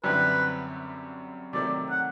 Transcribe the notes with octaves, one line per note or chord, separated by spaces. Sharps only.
F#2 D3 G3 C4 E4 B4
C3 D#3 F#3 A3 D5
F#5